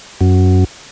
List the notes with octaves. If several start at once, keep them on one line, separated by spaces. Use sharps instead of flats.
F#2